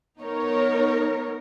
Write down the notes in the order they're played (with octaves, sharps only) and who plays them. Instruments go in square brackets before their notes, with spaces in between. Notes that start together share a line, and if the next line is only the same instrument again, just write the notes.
[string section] B3 D#4 A#4 C#5